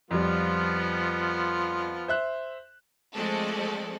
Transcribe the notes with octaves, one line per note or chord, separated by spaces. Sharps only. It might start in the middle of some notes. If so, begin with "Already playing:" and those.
F2 F3 G3 B3 F4
C5 E5 F#6
F3 G#3 A3 C4 A4 D5